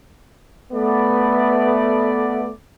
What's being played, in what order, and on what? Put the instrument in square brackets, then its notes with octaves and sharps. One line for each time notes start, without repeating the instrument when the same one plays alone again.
[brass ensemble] A3 B3 D5